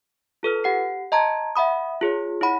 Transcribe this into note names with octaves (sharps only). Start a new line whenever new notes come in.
F4 A4 B4 F6
G4 F#5 C7
D#5 A5 A#5 C6 G#6
E5 F#5 B5 D#6
F4 G#4 C#5
E4 C#5 F#5 B5